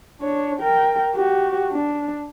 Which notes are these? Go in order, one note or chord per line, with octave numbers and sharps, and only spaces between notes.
D4 C#5
A#4 G5
F#4 G4
D4